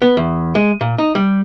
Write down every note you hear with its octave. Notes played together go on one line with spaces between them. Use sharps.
B3
E2
G#3
A#2
D#4
G3